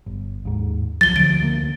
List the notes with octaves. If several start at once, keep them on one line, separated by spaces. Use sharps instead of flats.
G1
D#2 G#2
C2 F3 F#3 A6 G7
D2 F3 A6 D7
D2 F#3 A#3